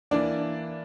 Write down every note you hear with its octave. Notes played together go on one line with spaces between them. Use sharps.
E3 A#3 D4 D5